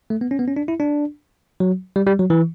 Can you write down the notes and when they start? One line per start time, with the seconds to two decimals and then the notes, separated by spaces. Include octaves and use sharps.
0.10 A3
0.21 B3
0.31 C#4
0.39 B3
0.48 C#4
0.56 D4
0.68 E4
0.80 D4
1.60 F#3
1.96 G3
2.07 G3
2.19 F#3
2.30 E3